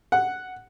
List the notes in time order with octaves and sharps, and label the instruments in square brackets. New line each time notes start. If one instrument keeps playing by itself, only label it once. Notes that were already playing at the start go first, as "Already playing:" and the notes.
[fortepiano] F#5